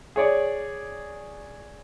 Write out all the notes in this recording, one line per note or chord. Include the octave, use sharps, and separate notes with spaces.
G#4 C#5 D5